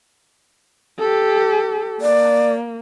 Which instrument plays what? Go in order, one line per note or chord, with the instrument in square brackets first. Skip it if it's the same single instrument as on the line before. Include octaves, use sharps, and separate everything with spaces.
[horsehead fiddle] G4 A4
[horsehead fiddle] A#3 [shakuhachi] D5